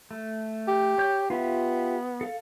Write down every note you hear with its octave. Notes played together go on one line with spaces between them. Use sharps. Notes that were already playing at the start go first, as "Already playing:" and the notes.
A3
G4
C#5 G6
B3 F4 G4 E5
A4 F5